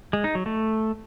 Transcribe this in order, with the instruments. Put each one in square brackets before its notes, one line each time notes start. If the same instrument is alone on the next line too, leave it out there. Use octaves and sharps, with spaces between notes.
[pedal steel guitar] G#3
D#4
F#3
A3